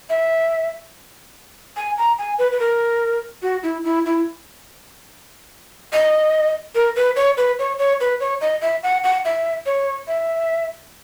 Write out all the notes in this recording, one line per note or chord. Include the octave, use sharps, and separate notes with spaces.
E5
G#5
A#5
G#5
B4
B4
A#4
F#4
E4
E4
E4
D#5
A#4
B4
C#5
B4
C#5
C#5
B4
C#5
D#5
E5
F#5
F#5
E5
C#5
E5